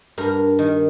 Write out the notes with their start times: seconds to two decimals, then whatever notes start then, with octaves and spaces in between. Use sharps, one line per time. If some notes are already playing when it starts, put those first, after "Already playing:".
0.18 G2 A#4
0.59 D#3